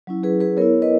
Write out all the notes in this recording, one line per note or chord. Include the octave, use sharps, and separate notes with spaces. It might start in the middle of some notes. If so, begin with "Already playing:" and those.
F#3 C#4 E4
G#4 B4
G#4 B4
B3 E4 A#4 C#5
B4 D#5